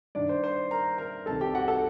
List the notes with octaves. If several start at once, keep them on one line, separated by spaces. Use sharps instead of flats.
G2 D#3 D4 D5
C5
C5
A#4 A#5
A#4 A#5
C2 C3 D#3 A4 A5
G4 G5
F#4 F#5
A4 A5